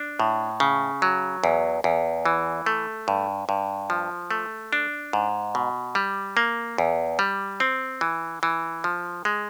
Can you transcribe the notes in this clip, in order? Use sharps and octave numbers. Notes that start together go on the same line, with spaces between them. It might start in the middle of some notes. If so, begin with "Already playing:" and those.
Already playing: D4
A2
C#3
F#3
E2
E2
E3
A3
G2
G2
F3
A3
D4
G#2
B2
G3
A#3
E2
G3
C4
E3
E3
F3
G#3